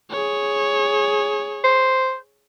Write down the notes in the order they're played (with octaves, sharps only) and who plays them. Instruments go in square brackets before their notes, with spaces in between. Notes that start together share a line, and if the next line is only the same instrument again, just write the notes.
[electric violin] G#4 C#5
[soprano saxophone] C5